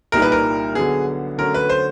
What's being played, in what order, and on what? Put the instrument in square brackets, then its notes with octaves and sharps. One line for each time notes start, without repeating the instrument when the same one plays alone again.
[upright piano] C2 A#2 G3 A#3 D#4 [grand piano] A#4
[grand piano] B4
A#4
[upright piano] D3 F#3 B3 [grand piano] G#4
[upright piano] D3 F#3 A3 C#4 [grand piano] A#4
[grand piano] B4
C5